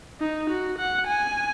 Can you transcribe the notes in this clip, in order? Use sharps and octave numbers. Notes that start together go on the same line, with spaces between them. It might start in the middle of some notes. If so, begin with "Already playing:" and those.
D#4
F#4
F#5
G#5